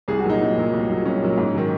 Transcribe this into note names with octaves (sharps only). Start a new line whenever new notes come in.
C2 G#4
F#4
A#2 F#3
D#4
C2
A#2 F#3
C2
A#2 F#3
C2 C#4
A#2 F#3
G#2
D#3 F#3